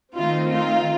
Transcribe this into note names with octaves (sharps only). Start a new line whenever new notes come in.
D#3 A3 C4 D#4 F4
F4